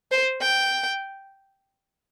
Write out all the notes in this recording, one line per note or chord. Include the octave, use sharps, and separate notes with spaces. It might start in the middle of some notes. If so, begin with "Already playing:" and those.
C5
G5